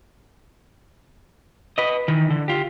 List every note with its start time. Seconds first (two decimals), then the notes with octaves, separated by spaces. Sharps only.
1.78 B4 D#5
2.08 D#3 E3
2.30 D3
2.48 F4 G4